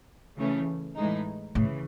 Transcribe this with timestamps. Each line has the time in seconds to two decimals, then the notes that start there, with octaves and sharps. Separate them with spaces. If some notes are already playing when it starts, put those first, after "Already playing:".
0.36 C#3 E3 A3 C#4
0.95 A2 E3 G#3 D#4
1.55 A2 C#3 E3